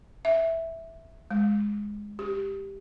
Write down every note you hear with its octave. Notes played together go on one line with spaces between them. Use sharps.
E5
G#3
G4